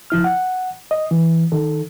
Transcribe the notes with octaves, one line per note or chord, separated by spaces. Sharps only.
C#2 F3 E4 F6
F#5
D#5
E3
D#3 A4